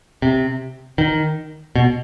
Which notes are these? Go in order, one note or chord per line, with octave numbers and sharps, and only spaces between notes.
C3
D#3
B2